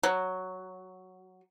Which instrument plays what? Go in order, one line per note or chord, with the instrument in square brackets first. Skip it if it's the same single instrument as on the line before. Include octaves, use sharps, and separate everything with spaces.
[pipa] F#3